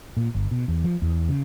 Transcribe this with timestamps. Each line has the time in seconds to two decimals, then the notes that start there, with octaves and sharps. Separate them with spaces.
0.17 A#2
0.35 G1
0.51 B2
0.68 E2
0.84 F3
1.02 E2
1.29 C#3